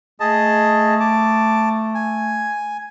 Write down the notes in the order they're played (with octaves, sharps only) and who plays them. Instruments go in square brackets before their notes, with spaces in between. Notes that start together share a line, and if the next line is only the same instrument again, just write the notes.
[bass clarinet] A3 [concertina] G#4 D#5 A5
[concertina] A5 D6
G#5